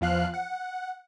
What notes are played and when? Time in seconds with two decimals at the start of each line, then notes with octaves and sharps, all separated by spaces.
0.01 E2 F3 F5 F#6
0.34 F#5